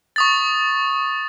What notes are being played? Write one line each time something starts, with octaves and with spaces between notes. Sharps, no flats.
C#6 D#6 A6